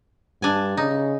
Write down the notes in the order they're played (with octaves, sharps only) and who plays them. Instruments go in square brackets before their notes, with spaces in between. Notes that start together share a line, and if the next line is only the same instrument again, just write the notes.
[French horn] G2 [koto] D4 G#5
[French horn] C#3 [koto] D#4